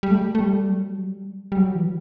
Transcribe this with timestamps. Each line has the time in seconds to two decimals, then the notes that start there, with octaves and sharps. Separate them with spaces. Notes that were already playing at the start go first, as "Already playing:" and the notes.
0.03 G3
0.11 A3
0.35 A3
0.40 G3
0.69 F#3
0.99 G3
1.52 G3
1.57 F#3
1.75 E3